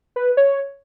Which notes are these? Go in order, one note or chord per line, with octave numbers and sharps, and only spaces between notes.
B4
C#5